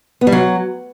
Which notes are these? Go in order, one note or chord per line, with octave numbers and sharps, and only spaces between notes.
B3
G3
F#3